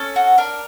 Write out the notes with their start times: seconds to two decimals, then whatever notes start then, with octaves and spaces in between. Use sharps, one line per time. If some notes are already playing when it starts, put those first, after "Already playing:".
Already playing: C#4 A4
0.16 F#4
0.38 D4 A#4